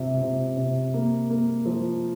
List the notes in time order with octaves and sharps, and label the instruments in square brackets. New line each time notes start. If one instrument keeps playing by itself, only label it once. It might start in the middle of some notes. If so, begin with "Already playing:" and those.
Already playing: [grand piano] C3 F4
C3
C3
A#3
A#3
F3